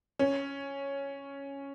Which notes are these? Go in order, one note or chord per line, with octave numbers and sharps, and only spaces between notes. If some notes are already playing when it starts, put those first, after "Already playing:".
C#4